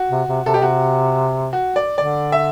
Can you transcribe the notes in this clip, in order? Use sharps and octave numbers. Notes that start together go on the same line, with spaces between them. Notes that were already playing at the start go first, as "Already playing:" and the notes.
Already playing: F#4
C3
C3
C3 A4
B2 G4
C3 F#4
F#4
D5
D3 D5
E5